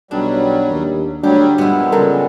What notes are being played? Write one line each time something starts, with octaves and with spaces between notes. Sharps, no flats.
B1 F#3 G3 D4
D#2
D2 F#3 G3 D4 G4
G2 A#2 G#3 B3 E4
C#3 F#3 G3 A4 A#4